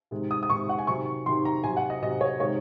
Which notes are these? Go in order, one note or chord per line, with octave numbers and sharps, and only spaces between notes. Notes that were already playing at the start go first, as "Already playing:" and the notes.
C3 D#3 G#3
D#6
D#6
C3 D#3 G#3 C#6
F#5
G#5
C3 D#3 F#3 C#6
C3 D#3 F#3 C6
A#5
C3 F#3 G#5
F#5
D#5
C3 F#3 D#5
C#5
C3 D#3 G#3 C#5